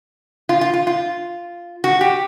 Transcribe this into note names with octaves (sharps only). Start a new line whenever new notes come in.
F4
F4
F4
F4
F#4
G4